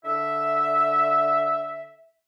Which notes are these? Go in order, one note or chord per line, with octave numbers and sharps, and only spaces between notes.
D3 E5